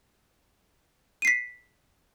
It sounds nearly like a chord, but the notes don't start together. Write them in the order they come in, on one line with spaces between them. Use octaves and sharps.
D#7 C7 B6